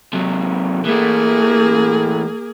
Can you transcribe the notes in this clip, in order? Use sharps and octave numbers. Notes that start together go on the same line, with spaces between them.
C3 F#3
E3 A3 A#3 G#4